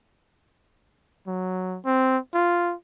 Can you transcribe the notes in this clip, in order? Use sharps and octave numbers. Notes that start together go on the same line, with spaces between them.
F#3
C4
F4